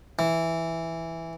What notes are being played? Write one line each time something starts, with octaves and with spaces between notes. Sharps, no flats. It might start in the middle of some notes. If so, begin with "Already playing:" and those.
E3